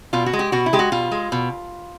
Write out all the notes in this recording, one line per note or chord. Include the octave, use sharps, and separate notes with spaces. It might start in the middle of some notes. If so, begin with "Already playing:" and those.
B2 F4
F#4
G#3
G4
B2 F#4
E4
G#3 G4
F#4
B2 F4
G#3
B2